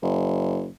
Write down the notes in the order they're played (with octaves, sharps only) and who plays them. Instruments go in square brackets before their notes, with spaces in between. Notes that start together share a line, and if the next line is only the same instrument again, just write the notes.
[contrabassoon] F#1